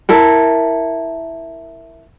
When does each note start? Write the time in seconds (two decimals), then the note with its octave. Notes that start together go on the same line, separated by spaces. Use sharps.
0.09 E4 A4 A#4